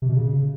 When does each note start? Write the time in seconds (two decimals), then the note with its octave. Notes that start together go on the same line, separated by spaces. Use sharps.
0.02 C3
0.09 B2
0.16 C#3